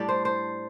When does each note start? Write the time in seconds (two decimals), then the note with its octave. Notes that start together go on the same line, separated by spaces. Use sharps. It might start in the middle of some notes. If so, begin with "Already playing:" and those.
Already playing: A2 G3 D4 D5
0.09 C5
0.25 C5